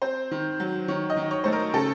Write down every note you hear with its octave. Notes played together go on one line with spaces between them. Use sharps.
C4 C5
D#3
F#3
D#3 C#5
D#5
D#3
C#5
A3 C5
A#4
C#3 A4